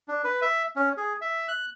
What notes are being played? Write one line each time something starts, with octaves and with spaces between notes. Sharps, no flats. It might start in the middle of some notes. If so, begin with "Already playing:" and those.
D4
B4
E5
C#4
G#4
E5
F#6